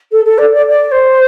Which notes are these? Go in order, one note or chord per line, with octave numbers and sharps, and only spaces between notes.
A4
A4
D5
D5
D5
C5